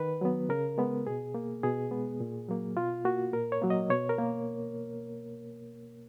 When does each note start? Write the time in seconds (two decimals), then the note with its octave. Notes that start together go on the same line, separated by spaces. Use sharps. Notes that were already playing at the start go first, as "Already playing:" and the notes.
Already playing: D#3 B4
0.21 F#3 B3
0.49 C#3 A#4
0.78 G#3 B3
1.07 B2 G#4
1.34 A#3
1.63 B2 G#4
1.91 G#3 B3
2.20 A#2
2.48 F#3 A#3
2.76 B2 F4
3.05 A#3 F#4
3.33 A#2 A#4
3.52 C#5
3.62 F#3 A#3
3.70 D#5
3.90 B2 C#5
4.09 A#4
4.18 A#3